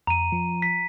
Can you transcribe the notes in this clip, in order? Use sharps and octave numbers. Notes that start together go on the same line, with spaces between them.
F2 A#5 D#7
F3
B6